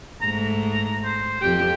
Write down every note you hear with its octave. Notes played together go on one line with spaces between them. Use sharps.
G#2 A3 A#5
C5
F2 G4 G5